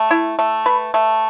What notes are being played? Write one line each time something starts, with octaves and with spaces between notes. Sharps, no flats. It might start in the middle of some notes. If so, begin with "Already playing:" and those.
Already playing: A3
E4
A3
B4
A3